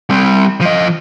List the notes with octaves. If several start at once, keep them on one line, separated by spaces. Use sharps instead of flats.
G3 C4
F3 D#5